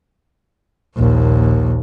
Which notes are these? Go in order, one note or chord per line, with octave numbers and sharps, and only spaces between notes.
A#1 D#2